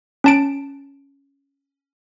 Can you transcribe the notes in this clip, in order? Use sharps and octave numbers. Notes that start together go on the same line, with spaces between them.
C#4 A5 D7